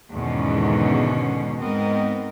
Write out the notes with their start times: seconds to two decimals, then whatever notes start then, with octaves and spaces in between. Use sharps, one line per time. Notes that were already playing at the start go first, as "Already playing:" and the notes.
0.12 E2 G#2 B2 D3 D#3 C#4
1.62 G#2 B3 C4 A#4 D#5